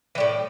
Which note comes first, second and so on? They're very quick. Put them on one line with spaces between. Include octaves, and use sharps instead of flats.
E3 G3 A2